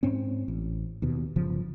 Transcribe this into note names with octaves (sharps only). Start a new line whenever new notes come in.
G#2 C4 C#4
A1
D#2 B2
G1 C#3 F3